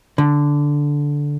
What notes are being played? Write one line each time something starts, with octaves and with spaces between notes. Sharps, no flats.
D3